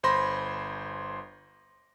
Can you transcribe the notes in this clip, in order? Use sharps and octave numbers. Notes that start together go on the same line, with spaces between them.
G1 C5 B5 C6 A#6